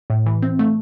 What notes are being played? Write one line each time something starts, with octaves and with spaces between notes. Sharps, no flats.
A2
E3
C4
A3